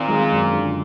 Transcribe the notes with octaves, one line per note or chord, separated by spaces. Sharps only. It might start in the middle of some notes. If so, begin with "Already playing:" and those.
Already playing: A#2 D#3 C4
G#3
F#2
D3